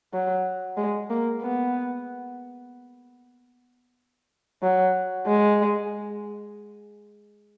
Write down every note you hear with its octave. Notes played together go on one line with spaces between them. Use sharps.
F#3
G#3
A#3
B3
F#3
G#3